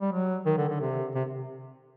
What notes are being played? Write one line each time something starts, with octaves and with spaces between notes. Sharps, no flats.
G3
F#3
D#3
D3
D3
C3
C3